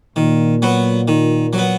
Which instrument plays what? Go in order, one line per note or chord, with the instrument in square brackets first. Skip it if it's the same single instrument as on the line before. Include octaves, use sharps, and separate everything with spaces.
[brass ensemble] A#2 [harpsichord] D#3
[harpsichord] F#3 B3
D#3
F#3
B3